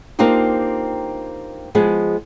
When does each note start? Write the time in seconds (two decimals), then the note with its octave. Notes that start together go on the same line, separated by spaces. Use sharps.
0.19 A#3 C4 D4 D#4 F4 G4
1.75 F3 G#3 B3 G#4